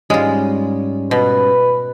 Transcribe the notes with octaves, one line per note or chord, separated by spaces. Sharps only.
G#2 G3 G#3 C#4 F4
B2 B4